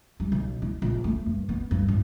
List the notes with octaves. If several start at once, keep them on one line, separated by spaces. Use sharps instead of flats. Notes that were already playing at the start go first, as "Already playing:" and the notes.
G3
B1
E4
A#1
A3
G2
B3
G2
A1